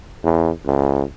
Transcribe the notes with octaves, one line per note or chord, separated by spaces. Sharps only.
E2
C#2